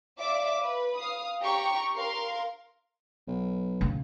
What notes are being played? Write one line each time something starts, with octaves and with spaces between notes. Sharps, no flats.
D5 E5 F5 D6
B4
F5 D#6
G4 G5 A#5 C#6
A#4 F5 C6
B1
C#3